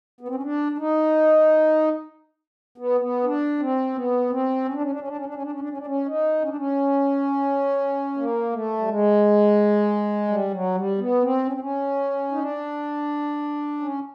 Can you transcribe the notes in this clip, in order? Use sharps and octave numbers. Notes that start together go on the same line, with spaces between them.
B3
C4
C#4
D4
D4
D#4
B3
B3
D4
C4
B3
C4
C#4
D4
C#4
D4
C#4
D4
C#4
D4
C#4
D4
C#4
D4
C#4
D4
C#4
D#4
C#4
D4
C#4
A#3
A3
G3
G#3
G3
F#3
G3
B3
C4
C#4
C4
C#4
D#4
D4
C#4